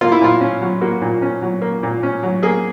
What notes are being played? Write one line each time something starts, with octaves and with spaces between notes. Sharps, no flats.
A#3 F4
E4
A#2 F4
C#4
F#3
A#3 F#4
A#2
C#4
F#3
A#3
A#2
C#4
F#3
A#3 G#4